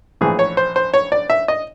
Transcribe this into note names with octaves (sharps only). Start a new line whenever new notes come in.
A#1 A2 E3 G#4
C#5
C5
C5
C#5
D5
E5
D#5